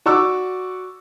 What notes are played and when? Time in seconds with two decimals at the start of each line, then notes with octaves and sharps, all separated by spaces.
0.06 F#4 D5 C#6 D6 E6